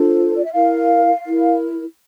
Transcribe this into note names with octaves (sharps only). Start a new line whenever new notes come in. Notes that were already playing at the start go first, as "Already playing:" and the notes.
Already playing: D4 F4 A4 C5
D5
E5
E4 A#4 F5
E4 A#4